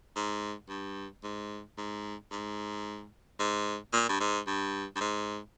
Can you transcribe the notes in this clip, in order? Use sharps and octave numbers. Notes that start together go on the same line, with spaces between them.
G#2
G2
G#2
G#2
G#2
G#2
A#2
G2
G#2
G2
G2
G#2